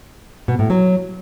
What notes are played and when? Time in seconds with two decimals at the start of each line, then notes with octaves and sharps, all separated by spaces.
0.48 B2
0.59 A2
0.70 F#3